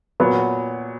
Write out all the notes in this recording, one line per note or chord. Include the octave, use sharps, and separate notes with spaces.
A#2 F#3 B3